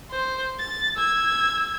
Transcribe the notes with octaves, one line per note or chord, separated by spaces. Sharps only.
C5
A6
E6 G#6